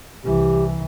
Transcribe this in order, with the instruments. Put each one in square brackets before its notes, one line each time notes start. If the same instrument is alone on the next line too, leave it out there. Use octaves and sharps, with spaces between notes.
[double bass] C2 E3 [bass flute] G4